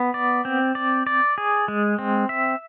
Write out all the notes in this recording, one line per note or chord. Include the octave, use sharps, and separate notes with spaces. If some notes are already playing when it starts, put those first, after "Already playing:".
Already playing: B3
D5
C4
D5
D5
G#4
G#3
C4
E5